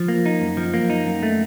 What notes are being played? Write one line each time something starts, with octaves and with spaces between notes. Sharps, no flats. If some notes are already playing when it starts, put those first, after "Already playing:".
Already playing: F3
A#3
D#4
F#2
F3
A#3
D#4
F#2
A3